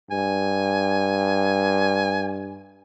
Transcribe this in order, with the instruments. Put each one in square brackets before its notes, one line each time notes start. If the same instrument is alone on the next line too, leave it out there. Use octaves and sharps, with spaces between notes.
[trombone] G2 [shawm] G#5